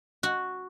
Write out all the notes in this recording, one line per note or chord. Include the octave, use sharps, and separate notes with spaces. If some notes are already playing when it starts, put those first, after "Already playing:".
F#4